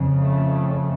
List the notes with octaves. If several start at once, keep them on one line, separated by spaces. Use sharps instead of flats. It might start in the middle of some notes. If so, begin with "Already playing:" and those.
Already playing: F2 C#3
A3